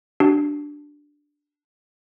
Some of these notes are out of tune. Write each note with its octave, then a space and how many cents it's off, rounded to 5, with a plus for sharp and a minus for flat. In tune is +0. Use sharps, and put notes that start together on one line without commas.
D4 +0 F#4 +45